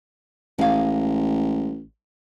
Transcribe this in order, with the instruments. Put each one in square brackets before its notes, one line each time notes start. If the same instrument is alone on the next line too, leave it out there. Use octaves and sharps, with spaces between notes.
[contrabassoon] A1 [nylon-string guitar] G#3 F5